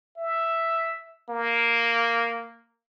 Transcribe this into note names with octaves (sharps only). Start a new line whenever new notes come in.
E5
A#3